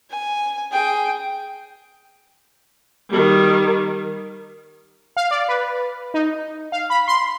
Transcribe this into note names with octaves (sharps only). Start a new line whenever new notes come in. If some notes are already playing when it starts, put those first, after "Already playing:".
G#5
G#4 G5
D#3 G3
F5
D5
B4
D#4
F5
B5
C6